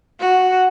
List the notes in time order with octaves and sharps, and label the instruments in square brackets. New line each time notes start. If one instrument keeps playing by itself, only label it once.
[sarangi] F#4